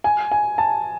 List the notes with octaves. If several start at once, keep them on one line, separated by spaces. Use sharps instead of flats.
G#5
G#5
A5